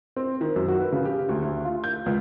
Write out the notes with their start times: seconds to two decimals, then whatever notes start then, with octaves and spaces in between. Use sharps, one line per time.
0.16 C4
0.41 D#3
0.56 F#2
0.68 F#4
0.80 B4
0.92 C#3
1.05 G4
1.29 D2
1.42 D2
1.65 F4
1.84 G6
2.06 C#2